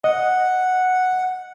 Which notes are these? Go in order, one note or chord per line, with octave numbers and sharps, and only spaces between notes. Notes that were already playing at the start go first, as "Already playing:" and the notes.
D#5 F#5